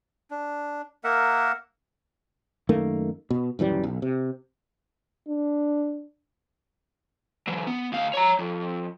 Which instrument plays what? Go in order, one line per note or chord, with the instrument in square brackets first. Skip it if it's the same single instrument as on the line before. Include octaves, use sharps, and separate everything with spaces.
[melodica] D4
A#3 A#4 E5 F#5
[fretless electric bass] F#2 D#3 A3 A#3
B2
D#1 F#2 E3 G3
B1
C3
[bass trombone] D4
[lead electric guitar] E3 F#3
B3
D2 F5
C#5 A#5
F2